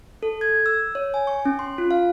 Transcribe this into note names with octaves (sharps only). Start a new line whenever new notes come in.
A4
G#6
E6
C#5
G#5
C#6
C#4
C6
F4
F5